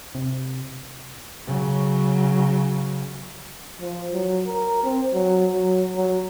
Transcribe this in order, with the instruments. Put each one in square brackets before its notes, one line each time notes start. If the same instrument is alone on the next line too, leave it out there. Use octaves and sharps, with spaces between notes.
[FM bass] C3
[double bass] C#3 F#3
[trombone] F3
F#3
A#4
C4
F#3
F#3
F#3